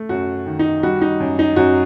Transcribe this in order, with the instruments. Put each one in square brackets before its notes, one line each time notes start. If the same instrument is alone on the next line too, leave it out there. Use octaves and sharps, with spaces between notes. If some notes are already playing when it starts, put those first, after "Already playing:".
Already playing: [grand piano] A3
F#2 F#4
D#3
D#4
G3 F#4
D#4
F#2
D#4
F#2 F#4